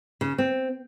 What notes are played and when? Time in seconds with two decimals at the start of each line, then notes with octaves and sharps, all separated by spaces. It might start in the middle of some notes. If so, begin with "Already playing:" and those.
0.21 C#3
0.38 C4